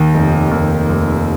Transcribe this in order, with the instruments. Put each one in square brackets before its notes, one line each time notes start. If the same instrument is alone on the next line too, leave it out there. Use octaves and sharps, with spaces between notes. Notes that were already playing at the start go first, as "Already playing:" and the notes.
Already playing: [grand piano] D#2 D#3
F1
D#2
F1